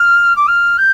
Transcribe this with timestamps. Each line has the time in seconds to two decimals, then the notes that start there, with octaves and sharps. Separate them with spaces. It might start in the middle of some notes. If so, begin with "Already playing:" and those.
Already playing: F6
0.36 D6
0.47 F6
0.77 G6